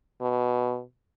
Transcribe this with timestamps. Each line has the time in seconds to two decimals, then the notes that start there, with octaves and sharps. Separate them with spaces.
0.21 B2